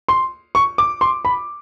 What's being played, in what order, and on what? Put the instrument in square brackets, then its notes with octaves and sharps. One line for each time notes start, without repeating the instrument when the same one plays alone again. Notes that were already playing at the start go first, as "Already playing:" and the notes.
[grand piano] C6
C#6
D6
C6
B5